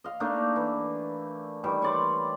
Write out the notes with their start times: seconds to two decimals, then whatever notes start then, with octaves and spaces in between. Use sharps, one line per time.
0.04 D#5 F5
0.20 A3 A#3 D4 D#4
0.56 E3
1.64 D#3 E3 G3
1.82 C#5 D5 C6